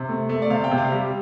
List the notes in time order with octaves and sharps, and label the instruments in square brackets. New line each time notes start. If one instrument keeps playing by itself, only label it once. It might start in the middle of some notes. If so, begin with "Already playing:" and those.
Already playing: [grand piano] C3
A3
A3
D5
C3 F5
G5
C3
F5
G3